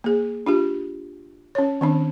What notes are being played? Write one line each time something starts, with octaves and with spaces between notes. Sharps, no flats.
A#3 G#4
D4 F4 G4
C#4 C#5
D#3 C4 D4